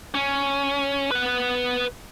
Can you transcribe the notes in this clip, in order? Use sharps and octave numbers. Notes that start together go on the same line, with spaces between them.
C#4
B4 F#5